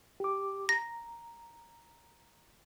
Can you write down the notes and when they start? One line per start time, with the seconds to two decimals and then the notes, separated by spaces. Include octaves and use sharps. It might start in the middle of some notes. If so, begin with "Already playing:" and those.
0.20 G4 D6
0.69 A#5 A#6